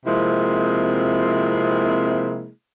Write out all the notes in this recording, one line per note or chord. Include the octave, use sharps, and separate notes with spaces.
C3 F3 G#3 A#3 C4 E4